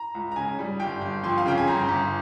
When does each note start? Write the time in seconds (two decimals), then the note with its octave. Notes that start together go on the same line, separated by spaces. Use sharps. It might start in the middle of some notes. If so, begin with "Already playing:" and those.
Already playing: A#5
0.15 C#2
0.31 A#5
0.36 C#3 G#5
0.59 G3
0.80 G1 G5
1.01 G1
1.24 F2 C6
1.38 F5
1.46 C#3 G5
1.58 G#5
1.67 G1 A#5
1.89 G1